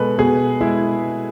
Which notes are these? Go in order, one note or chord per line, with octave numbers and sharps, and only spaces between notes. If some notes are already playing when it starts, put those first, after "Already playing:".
Already playing: B2 G#3 A4 B4
B2 G#4
G#3 E4